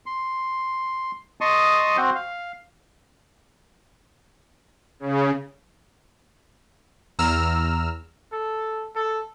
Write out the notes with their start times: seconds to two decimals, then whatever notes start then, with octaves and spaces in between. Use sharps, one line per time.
0.06 C6
1.41 D#5 A5 C6 C#6 D#6
1.97 C4 F#4 C5
2.15 F5
5.00 C#3
7.19 E2 A#5 E6 F6
8.32 A4
8.95 A4